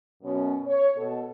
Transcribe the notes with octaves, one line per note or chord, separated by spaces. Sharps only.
F#2 B2 C#4
C#5
B2 A4